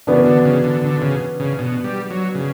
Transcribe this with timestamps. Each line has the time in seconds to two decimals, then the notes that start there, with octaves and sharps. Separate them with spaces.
0.07 C#3 E3 B3 D4 F#4
0.26 D3
0.45 C#3
0.64 D3
0.84 D3
1.02 C#3
1.40 C#3
1.59 B2
1.84 G3
2.10 F#3
2.35 C#3